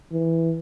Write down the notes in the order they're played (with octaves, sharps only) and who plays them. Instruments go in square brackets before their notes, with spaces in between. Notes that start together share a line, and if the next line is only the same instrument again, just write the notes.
[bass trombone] E3